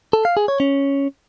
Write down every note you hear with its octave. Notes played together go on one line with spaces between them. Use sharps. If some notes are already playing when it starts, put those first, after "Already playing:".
A4
F5
G#4
C#5
C#4